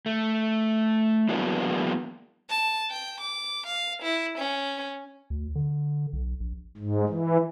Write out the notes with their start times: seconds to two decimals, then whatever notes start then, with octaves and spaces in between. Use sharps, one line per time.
0.06 A3
1.29 E3 F#3 G#3 A#3 B3 D4
2.50 A5
2.90 G5
3.20 D6
3.67 F5
4.02 E4
4.38 C#4
5.30 D2
5.55 D3
6.13 B1
6.40 A#1
6.77 G#2
7.09 E3